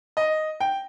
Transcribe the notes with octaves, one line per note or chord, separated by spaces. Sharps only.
D#5
G5